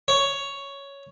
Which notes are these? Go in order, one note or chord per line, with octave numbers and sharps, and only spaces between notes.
C#5